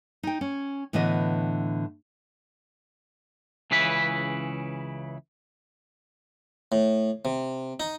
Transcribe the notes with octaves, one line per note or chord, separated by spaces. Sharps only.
D#4 G5
C#4
A2 D3 E3 B3 D#5
C#2 C#3 E3 E4 B4 B5
A2
C3
D#4